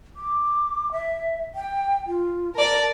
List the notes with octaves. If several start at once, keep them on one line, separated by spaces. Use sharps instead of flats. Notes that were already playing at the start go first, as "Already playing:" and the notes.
D6
E5
G5
F4
A#4 D5 A5